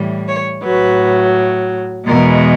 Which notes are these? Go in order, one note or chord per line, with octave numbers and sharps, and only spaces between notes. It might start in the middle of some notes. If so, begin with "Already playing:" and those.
Already playing: A2 E3 G3
C#5
A2 F#3 B4
E2 B2 G#3 A#4